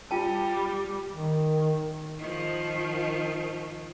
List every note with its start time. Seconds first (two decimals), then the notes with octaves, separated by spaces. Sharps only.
0.11 G3 F4 G5 A5
1.10 D#3
2.18 D#3 F3